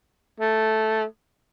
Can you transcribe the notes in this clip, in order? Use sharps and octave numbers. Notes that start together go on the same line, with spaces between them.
A3